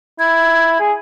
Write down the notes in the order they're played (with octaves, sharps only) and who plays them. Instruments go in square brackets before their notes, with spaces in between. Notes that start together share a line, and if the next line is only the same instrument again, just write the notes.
[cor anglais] E4 [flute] G#6
[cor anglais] G#4